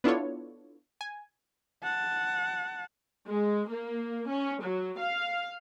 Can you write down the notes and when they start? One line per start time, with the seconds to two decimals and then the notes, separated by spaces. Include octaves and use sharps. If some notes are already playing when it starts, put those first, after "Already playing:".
0.04 B3 D4 E4 F4 A4 C#5
1.01 G#5
1.83 F#5 A5
3.26 G#3
3.68 A#3
4.29 C#4
4.62 F#3
4.99 F5